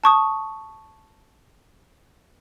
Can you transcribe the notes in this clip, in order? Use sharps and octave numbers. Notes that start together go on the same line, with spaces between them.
A5 C#6 D#6